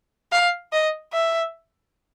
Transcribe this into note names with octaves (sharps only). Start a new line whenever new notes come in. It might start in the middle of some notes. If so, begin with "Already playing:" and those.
F5
D#5
E5